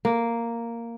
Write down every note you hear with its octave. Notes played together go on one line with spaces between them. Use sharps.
A#3